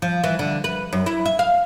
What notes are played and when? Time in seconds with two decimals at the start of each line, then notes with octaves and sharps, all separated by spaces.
0.02 F3
0.24 E3
0.39 D3
0.64 B4
0.93 F#2
1.06 E4
1.26 E5
1.39 F5